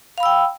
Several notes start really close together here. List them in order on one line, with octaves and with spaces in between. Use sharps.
F5 B5 E6 G5